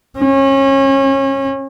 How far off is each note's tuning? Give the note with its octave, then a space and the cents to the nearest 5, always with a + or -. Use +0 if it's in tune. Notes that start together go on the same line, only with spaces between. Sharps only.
C#4 -30